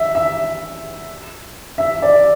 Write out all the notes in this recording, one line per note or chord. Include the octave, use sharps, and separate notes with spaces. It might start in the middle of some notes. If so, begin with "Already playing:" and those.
Already playing: E5
E5
E5
D5